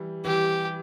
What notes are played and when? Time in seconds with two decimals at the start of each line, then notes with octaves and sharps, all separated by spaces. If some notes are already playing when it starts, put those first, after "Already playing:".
Already playing: E3 G3
0.24 E3 G3 G4